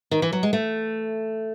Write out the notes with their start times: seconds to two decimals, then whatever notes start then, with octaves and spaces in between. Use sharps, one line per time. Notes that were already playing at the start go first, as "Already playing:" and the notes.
0.11 D#3
0.22 E3
0.33 F#3
0.43 G#3
0.53 A3